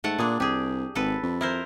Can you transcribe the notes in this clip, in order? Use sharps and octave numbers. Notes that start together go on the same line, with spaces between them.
G#2 A3 F#5 A5
A#2 D4 G#4
C2 G4 G#4
G#1 A4 B4
F2
E4 A#4 C5